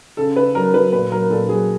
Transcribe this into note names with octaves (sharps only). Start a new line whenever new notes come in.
C#3 A4
C#3 B4
F#3 A#4
F#3 B4
A#2 B4
F#3 A#4
A#2 A4
F#3 G#4